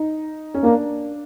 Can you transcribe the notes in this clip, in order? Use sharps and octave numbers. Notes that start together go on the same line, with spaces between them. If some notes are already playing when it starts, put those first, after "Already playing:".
Already playing: D#4
C#4
A#3 D4